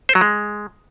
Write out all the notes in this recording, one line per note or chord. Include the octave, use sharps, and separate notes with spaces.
C5
F#3
G#3